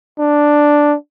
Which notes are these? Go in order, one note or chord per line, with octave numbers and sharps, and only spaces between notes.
D4